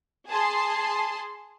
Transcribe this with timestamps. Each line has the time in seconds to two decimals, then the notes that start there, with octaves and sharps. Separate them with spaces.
0.29 G#4 A5 C6